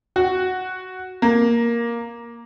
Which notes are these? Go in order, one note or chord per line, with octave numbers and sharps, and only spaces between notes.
F#4
A#3